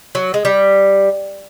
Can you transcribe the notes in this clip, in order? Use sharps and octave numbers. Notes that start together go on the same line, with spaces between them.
F#3
G#3
G3